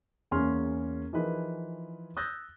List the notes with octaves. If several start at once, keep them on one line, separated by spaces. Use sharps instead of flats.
E2 A#3 C#4 G#4 C6 F6
E3 F3 D#4 G#4 A#4 B4
D#6 E6 F#6 G6 A6 A#6